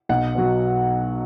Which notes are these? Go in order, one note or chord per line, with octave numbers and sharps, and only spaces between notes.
B1 F#5
B2 F#3